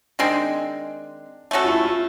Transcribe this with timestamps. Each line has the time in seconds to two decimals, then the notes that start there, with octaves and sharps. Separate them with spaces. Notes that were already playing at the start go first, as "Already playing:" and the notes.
0.19 D#3 G#3 C4 D4
1.51 A3 C#4 F#4 A4
1.64 F4
1.68 E4
1.85 F4